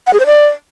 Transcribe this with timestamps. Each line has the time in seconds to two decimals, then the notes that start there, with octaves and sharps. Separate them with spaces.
0.07 F#5
0.13 G#4
0.20 C5
0.26 D5